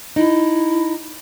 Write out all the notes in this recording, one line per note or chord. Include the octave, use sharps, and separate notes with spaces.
D#4 E4